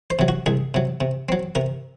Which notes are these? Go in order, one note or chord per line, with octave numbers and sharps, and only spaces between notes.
C5
C3 F#3
F#4
C2 G#4
C3 F#3
C3
F#3 C4
C3 A#4